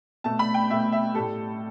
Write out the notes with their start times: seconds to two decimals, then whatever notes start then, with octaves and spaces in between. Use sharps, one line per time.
0.24 B2 A3 A5
0.39 B5
0.54 G5
0.70 B2 A3 E5
0.92 E5
1.14 A2 G3 A4